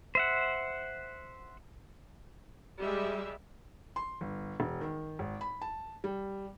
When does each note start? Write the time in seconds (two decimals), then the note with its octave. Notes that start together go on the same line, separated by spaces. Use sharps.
0.15 C5 E5 F#5
2.79 G3 G#3 G4 E5
3.96 C6
4.21 G1
4.60 E1
4.81 D#3
5.19 G#1
5.41 B5
5.62 A5
6.04 G3